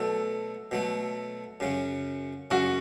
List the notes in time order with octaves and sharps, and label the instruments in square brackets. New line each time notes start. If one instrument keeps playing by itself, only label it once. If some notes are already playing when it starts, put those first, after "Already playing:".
Already playing: [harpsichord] B2 F#3 A3 [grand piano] A4
[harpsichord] B2 F#3 A3
F#2 C#3 F#3 C#4
[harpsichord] F#2 C#3 F#3 C#4 [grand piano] F#4